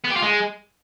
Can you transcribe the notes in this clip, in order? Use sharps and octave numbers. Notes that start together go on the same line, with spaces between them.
B3
G4
F4
G#3